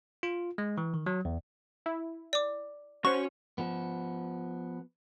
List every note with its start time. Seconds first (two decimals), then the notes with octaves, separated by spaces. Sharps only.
0.23 F4
0.58 G#3
0.78 E3
0.94 D#3
1.06 F#3
1.25 E2
1.86 E4
2.33 D5 D6
3.05 C#4 F#4 C5 C#5 C#6
3.58 F3 B3